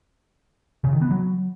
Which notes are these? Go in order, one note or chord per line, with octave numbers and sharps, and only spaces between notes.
C#3
D#3
B3
F#3